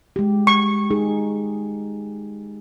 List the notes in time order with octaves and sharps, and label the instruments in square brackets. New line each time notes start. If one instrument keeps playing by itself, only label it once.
[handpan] G#3 G4
[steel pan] C#6
[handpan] D#4 G#4